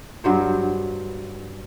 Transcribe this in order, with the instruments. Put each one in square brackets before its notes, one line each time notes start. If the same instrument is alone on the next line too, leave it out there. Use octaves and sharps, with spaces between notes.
[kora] G2 F#3 C5